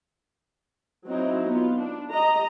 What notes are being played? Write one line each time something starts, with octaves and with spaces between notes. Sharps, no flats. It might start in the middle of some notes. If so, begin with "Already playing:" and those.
F#3 C4 D#4 E4
B3 F4
D4
G4 D#5 A#5